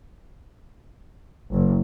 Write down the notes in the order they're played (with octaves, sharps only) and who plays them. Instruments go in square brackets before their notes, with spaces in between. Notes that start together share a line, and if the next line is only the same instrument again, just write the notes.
[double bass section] F#1